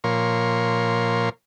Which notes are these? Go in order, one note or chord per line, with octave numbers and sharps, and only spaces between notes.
A#2 F3 A#4 C#5 C6